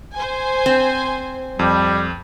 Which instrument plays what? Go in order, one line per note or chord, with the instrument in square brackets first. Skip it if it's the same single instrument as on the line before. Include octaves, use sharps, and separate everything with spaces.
[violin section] C5 G#5
[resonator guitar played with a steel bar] C4
[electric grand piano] F2 [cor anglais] G3